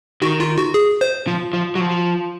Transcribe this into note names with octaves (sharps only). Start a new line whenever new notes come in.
D#3 F#4
F4
F#4
G#4
C5
F3
F3
F#3
F3